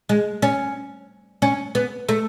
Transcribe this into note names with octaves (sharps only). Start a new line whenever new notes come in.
G#3
C#4
C#4
B3
A3